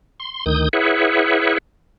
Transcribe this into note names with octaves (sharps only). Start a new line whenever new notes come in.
C6
D2 D#3 D#6 G6
E4 G#4 B4 C#5 E5 F#5